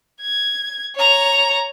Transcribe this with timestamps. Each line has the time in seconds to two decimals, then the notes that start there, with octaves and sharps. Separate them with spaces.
0.22 G#6
0.96 C#5 A#5